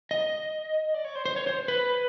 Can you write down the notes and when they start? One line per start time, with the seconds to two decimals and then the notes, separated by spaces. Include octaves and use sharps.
0.11 D#5
0.94 D5
1.05 C#5
1.15 C5
1.26 C5
1.36 C#5
1.47 C5
1.68 B4